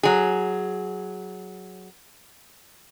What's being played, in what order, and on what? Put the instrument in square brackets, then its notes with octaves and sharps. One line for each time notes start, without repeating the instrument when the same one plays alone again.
[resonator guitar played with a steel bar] F#3 G#4